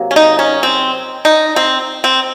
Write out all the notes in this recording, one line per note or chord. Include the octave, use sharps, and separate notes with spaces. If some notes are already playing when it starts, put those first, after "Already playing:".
Already playing: C3 F#3 A#3
C#4
D#4
C#4
C4
D#4
C4
C4